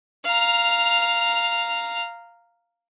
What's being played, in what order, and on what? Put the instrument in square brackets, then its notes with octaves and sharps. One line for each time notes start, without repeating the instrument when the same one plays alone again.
[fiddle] F5 A#5